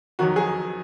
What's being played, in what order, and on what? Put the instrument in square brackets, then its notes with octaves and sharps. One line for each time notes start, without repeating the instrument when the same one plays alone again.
[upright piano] F2 D#3 F#3 F#4
G#4